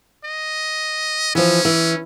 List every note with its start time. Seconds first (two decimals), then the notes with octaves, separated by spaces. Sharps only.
0.24 D#5
1.35 E3 F3 C#4
1.65 E3